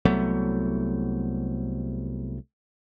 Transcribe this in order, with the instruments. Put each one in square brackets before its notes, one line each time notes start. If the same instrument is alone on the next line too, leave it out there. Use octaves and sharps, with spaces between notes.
[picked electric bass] C2 F#3 A3 B3